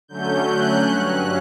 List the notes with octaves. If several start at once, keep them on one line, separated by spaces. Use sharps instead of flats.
D3 F#3 A3 C#4 G6
F#6
G2 F#3 C#4 F#6